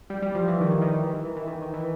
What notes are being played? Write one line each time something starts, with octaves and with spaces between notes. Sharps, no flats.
G3
G3
F3
E3
D#3
E3
D#3
E3
D#3
E3
D#3
E3
D#3
D#3
E3